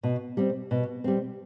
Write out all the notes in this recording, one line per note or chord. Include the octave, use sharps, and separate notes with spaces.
B2
G3 C4
B2
G3 C4